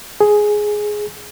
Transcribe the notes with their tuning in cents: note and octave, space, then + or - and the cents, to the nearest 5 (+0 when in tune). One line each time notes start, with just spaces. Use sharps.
G#4 +5